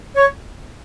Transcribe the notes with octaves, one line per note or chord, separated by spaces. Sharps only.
C#5